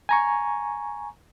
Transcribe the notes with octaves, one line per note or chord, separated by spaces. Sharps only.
G#5 A#5 C#6